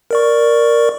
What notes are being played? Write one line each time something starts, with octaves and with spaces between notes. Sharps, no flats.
A#4 D5 C#6